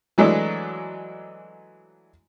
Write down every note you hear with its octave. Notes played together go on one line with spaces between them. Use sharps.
E3 F#3 G#3 A3 D4